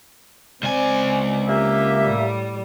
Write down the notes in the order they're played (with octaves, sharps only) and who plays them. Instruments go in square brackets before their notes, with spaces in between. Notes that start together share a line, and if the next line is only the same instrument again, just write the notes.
[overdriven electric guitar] C#2 G#5 [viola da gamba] C4 D5
[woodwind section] A#3 G4 E5 [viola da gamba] C#4
[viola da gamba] A2 G3